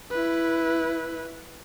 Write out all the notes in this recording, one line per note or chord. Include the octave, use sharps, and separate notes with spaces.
E4 B4